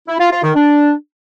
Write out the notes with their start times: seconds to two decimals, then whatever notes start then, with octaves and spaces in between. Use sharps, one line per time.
0.08 E4
0.20 F4
0.32 F4
0.43 D#3
0.55 D4